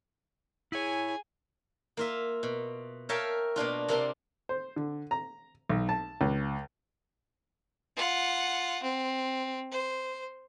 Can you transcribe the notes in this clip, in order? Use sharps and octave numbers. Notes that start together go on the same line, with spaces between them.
E4 G#4 C#5 G#5
A#3 F4 E5
B2
A#4 C#5 E5 F5 G5 A5
B2 A#3 D4 F4
C3 A#3 D4 A5 C6
C5
D3
A#5
B1
A5
C#2
F4 F#5
C4
C5